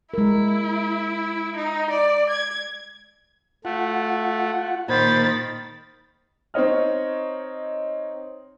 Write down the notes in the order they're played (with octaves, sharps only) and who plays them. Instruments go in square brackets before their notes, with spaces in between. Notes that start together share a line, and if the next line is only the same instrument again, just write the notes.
[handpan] G#3 A#4 [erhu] E4
[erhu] D#4
D5
G#6
[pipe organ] A3 [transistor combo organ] F4 F#5
[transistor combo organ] A#2 [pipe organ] D#3 [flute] C5 [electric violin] B5 A6
[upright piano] C4 D#4 C#5 D#5 F6